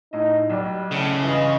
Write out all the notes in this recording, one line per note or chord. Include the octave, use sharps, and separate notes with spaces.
A2 D#4 D#5
B1 G3 D5
A2 C#3
G2 E3 F4 D#5